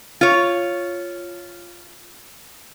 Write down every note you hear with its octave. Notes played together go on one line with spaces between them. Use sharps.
F4 C#5